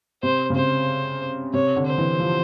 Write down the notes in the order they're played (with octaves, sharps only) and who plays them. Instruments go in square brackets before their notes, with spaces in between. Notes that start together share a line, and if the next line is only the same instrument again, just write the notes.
[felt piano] C3 [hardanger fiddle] C5
[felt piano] C#3
[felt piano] C3 [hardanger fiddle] C5
[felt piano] C3 [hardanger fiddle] C#5
[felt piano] D3
[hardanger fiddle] C5
[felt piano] E3
F3